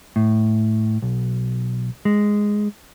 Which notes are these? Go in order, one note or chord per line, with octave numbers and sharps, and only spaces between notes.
A2
B1
G#3